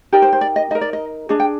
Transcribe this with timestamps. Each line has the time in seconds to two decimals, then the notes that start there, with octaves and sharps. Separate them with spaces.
0.12 D#4 G4 A#4 D5
0.22 C5
0.33 C5
0.41 D5
0.56 D#5
0.71 D#4 A#4 D#5
0.81 D5
0.93 D#5
1.29 D4 G#4 D#5
1.40 G5